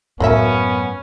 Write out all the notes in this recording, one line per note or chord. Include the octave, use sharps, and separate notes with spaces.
F#2 A2 F#3 A#3 B3 C#4 E5